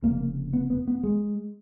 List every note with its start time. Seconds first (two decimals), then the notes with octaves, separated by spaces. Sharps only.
0.02 F1 F2 C#3 A#3
0.53 B3
0.70 B3
0.87 B3
1.03 G#3